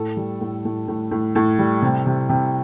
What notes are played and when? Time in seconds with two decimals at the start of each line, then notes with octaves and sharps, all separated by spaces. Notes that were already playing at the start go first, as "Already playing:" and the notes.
Already playing: A2 A4
0.17 G3
0.41 A2
0.65 A2
0.88 A2
1.11 A2
1.35 A2
1.59 G3
1.82 C3
2.06 C3
2.29 C3